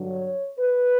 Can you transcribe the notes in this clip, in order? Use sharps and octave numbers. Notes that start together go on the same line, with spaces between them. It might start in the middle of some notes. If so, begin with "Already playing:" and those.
Already playing: G2 D3 F#3
C#5
B4